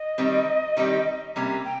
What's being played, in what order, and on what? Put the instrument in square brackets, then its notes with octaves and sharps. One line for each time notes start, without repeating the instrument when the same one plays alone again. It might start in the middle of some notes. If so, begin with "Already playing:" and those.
Already playing: [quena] D#5
[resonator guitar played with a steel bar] D#3 G3 C4
D#3 G3 C4 D#4 G4
[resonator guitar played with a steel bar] C3 G3 A#3 C#4 [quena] A#5
[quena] G5